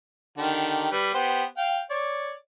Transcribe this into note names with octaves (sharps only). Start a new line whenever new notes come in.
D3 D#3 G4
G3 B4
B3 G4 C5
F5 G5
C#5 D5